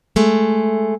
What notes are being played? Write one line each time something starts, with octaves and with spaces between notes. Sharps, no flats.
G#3 A3